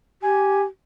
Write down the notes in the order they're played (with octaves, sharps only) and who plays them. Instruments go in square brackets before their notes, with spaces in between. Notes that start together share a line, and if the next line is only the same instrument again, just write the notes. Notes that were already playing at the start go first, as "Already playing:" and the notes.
[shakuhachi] G4 [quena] G#5